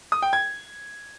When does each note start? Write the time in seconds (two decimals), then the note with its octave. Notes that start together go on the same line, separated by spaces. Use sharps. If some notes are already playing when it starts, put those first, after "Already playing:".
0.12 D#6
0.22 G5
0.33 G#6